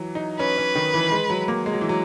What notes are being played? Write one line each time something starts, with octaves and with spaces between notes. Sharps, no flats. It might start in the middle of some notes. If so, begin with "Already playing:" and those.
Already playing: E3 F#3
D#4
C#4 B4
C#4
D#3
E3
G#3
F#3
A#3
G#3
F#3
E3
F#3